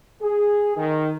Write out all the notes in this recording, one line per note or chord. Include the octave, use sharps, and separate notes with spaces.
G#4
D#3